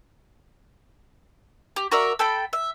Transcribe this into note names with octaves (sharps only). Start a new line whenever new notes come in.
G4
F#4 A#4 D5 E5
A4 G5 B5
E5